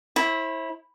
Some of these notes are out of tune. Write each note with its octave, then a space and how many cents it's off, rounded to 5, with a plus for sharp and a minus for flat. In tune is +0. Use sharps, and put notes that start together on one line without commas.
E4 -10 C5 +40